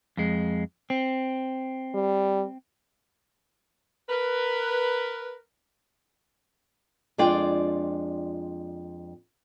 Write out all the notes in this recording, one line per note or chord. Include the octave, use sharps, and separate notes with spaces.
F2 G#3
C4
G3
A#4 B4
F2 G#3 D4 F4 D5 G5